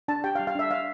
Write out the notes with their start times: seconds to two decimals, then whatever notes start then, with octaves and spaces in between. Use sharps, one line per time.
0.08 D4 A5
0.24 G4 G5
0.35 F5
0.39 G3
0.47 F5
0.55 D4 E5
0.70 D4 F5